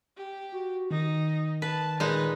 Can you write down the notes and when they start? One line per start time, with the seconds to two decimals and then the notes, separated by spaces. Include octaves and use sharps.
0.17 G4
0.52 F#4
0.91 D#3 D#4
1.62 B4 A5
2.00 A#2 G#3 D#4 B4